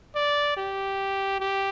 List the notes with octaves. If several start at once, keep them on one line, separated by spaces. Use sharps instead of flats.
D5
G4
G4